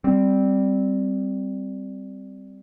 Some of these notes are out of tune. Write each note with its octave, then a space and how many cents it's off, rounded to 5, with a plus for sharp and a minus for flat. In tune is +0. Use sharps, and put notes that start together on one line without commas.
G3 +0 C4 +0